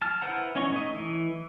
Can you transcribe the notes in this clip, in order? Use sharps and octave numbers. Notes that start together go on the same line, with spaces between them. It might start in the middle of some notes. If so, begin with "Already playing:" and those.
A5 F6
E4 B4 C5 F#5 A#5
E3 C#4 C#5 D#5 C#6
A3 D#4 D#5
E3